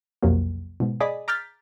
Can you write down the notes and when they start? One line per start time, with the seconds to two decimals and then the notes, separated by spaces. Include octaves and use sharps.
0.23 B1 F2 C3 F#3 A#3
0.80 G#2 B2
1.00 G#4 D5 D#5 B5
1.28 A#5 D6 F6 G6 A6 B6